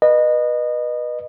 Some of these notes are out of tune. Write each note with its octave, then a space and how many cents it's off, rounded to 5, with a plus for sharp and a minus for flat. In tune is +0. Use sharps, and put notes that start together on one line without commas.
B4 -20 D#5 -25